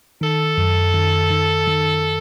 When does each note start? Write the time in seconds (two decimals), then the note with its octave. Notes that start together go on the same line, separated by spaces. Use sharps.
0.21 D#3 A4
0.58 F#2
0.94 D#3
1.30 D#3
1.67 D#3